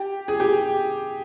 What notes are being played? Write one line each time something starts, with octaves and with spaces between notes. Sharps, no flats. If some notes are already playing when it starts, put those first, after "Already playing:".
Already playing: G4
G#4
G4